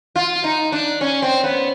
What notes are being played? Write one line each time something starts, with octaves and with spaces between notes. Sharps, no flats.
F4
D#4
D4
C#4
C4
B3